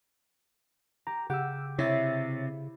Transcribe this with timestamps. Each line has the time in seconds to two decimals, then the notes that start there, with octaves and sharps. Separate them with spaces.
1.07 G4 A#5
1.30 C#3 G4 F#5 E6
1.78 C3 E4 C#5 E5 A6